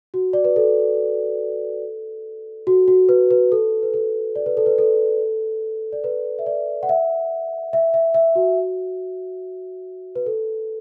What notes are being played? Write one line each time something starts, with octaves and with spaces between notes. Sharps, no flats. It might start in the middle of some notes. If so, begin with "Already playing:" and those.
F#4
D5
B4
A4
F#4
F#4
B4
B4
A4
B4
A4
D5
B4
A4
B4
A4
D5
B4
E5
D5
F#5
E5
E5
E5
E5
F#4
B4
A4